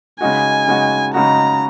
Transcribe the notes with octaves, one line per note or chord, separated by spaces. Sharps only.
C#3 G#3 D#4 F#4 G#5
C#3 G#3 D#4 F#4
C#3 G#3 D#4 F#4 A#5